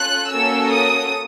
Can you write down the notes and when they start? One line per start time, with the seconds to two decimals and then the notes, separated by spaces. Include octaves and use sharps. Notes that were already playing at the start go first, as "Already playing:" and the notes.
Already playing: C#4 F4 A4 F#6
0.30 A#3 C#4 F#4 A4 E6
0.70 D#6